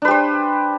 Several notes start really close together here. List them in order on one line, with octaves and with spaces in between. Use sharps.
D4 B4 G4 C5